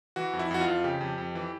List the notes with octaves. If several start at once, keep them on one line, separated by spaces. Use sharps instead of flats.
E3 F#4
F2
E4
F2 F#4
F4
F2
C#3 G4
F2
F2
E3